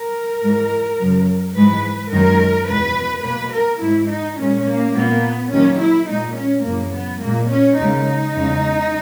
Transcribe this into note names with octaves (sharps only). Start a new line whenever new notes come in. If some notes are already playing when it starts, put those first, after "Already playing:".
Already playing: A#4
G#2 E3 G#3
F#2 C#3 F#3
G#2 E3 G#3 B4
F#2 D#3 G#3 A#4
E2 B2 G#3 B4
B2 A#3 B4
A#4
G#2 E3 G#3 E4
D#4
A#2 G#3 C#4
A#3
A#2 A#3 B3
D#2 D#3 F#3 A#3 C#4
E4
A#2 G#3 D#4
C#4
F#2 C#3 E3 A#3
B3
A#2 G#3 A#3
C#4
D#2 C#3 G#3 D#4
E2 C#3 G#3